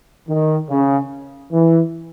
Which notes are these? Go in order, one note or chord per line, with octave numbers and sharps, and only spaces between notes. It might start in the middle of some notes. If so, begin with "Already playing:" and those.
D#3
C#3
E3